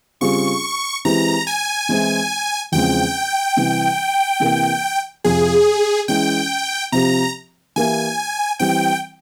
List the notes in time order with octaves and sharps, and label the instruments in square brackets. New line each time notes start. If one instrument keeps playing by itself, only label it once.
[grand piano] C#3 G3 C4 F4 G#4 [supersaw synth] C#6
[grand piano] E3 G#3 C4 G4 [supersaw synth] A#5
[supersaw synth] G#5
[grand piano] E3 G#3 C4 E4
[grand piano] E2 C#3 F3 G#3 C4 [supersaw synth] G5
[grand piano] C3 E3 G3 C4
C3 E3 A#3
[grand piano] F2 C3 F3 [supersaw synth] G#4
[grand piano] E3 G#3 C#4 E4 [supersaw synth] G5
[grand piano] C3 F3 C4 G4 [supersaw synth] A#5
[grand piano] E3 A#3 E4 G4 [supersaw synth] G#5
[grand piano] E3 G3 C4 [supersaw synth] G5